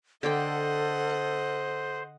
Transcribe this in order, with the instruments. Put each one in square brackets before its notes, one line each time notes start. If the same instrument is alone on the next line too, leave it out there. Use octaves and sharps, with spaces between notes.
[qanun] D3 D5 G5 [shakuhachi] A4 [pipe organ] C5 [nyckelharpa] D#5 F#5